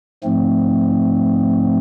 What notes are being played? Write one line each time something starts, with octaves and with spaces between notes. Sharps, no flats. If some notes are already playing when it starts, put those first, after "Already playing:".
G#2 F3 A3 C4